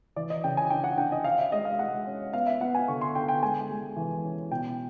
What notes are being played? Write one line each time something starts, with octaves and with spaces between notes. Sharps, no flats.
E3 D5
D#5
C#3 G5
G#5
D4 G5
F#5
D4 G5
D#5
C#4 F5
E5
G#3 D#5
F5
G#3 F#5
C#4
B3 F5
E5
B3 F#5
G#5
D3 C#6
C6
D3 G5
G5
G#3 G#5
G#3
E3
C#4
B2 G5